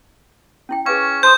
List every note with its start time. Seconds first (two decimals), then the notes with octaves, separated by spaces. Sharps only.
0.69 C#4 E4 G5
0.86 C#4 G#4 B4 F5 C#6
1.23 C5 A5 C6 D#6 G6